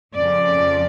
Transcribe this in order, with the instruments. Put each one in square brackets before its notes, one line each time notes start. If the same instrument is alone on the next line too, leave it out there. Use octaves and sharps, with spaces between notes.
[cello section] F2 C#3 F3 D5